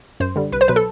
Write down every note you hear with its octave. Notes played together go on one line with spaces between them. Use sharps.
F#2 C5
D3 G3
C2 B4
C5
B2 F#3 B4
A4